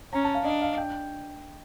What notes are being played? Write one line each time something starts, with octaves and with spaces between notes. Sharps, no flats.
C#4 A#5
A5
F5
D4 D#5
F5
G5